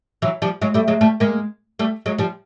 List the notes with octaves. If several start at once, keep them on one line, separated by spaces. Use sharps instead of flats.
E3 F#3
F3 G3
F#3 G#3
G3 A3
F#3 G#3
G3 A3
G#3 A#3
G3 A3
F#3 G#3
F3 G3